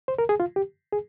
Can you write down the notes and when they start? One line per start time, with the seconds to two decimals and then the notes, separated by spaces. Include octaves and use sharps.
0.08 C5
0.19 A#4
0.29 G#4
0.40 F4
0.56 G4
0.92 G#4